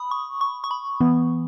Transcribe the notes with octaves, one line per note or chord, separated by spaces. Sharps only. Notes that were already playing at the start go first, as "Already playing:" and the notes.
Already playing: B5 D#6
C#6
C#6
C#6
B5
E3 B3